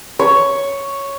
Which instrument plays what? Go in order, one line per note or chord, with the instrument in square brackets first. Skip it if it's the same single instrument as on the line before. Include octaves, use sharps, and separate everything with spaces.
[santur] C#5